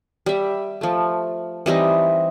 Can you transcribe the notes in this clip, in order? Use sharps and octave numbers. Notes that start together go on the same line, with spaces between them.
G3 E5
F3 A3
E3 G3 C4 D#4